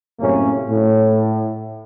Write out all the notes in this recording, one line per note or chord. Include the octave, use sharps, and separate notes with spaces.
F#2 A2 C3 A#3 C#4
A2